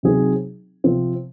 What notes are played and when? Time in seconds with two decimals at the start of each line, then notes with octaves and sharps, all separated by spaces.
0.03 C3 F#3 C4 D#4 G#4
0.84 C3 F3 C4